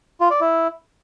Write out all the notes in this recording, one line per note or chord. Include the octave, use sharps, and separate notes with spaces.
F4
D5
E4